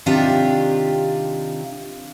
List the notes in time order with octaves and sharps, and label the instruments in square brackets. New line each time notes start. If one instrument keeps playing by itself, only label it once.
[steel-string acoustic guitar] C3 D#3 D4 F4 G4